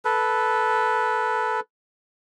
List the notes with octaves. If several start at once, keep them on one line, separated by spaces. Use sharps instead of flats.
A4 B4